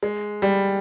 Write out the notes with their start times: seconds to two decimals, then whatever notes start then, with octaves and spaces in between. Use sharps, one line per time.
0.03 G#3
0.42 G3